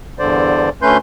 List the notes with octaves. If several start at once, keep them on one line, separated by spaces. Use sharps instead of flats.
E2 G2 D3 C5 D5
D2 A3 C#4 B4 C6 G6